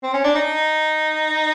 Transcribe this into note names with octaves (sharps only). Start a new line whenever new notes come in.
C4
C#4
D4
D#4